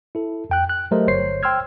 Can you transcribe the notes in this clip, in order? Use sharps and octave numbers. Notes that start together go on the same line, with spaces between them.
E4 A4
F2 G5 F#6
F#6
F#3 A3 G4 A#4 C5 D#5
G1 C5 C#5 C7
G5 C6 E6 F6 G#6